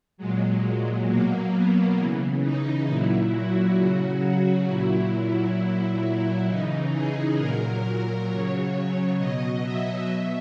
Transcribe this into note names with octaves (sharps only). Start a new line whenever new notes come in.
A#2 F#3 G#3
B2 F#3 A#3
B3
C#3 E3
D#4
A#2 F#3 E4
F#4
C#3 F#3
A#2 F#3 E4
A#2 F#3
C#3 E3 D#4
G#4
A#2 F#3 A#4
C#3 F#3 C#5
B2 F#3 D#5
E5
B2 E5